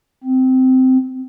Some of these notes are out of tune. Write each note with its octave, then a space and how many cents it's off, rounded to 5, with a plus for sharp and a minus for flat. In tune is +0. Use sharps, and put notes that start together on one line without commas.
C4 -15